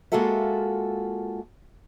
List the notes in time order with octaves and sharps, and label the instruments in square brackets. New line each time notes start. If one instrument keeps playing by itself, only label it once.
[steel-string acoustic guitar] G#3 A#3 F4 F#4 A4 E5